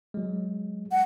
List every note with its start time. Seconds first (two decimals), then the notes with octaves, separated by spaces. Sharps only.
0.14 F#3 G#3
0.92 F#5